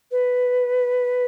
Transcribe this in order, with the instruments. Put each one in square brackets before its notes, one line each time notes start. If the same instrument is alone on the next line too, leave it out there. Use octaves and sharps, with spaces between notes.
[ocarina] B4